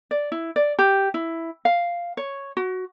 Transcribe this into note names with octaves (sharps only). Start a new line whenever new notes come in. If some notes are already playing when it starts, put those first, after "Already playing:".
D5
E4
D5
G4
E4
F5
C#5
F#4